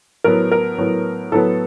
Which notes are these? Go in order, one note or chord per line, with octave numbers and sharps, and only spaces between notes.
A2 F#3 B3 A#4
A#4
A2 F#3 B3
A2 F#3 B3 A4